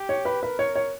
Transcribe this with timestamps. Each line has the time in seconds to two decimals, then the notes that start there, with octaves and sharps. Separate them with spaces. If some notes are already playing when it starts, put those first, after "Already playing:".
Already playing: G4
0.09 C#5
0.25 B4
0.42 A#4 B4
0.59 C#5
0.75 C#5